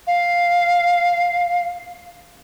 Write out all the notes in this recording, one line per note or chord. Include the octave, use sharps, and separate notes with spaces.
F5